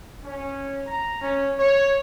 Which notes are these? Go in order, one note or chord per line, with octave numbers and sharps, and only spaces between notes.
C#4
A#5
C#4
C#5